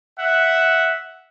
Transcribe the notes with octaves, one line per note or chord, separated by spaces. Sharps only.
E5 F#5